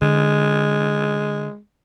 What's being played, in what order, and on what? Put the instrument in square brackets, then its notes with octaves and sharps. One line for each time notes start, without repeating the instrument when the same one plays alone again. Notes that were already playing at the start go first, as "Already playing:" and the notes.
[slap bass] D3 [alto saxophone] G#3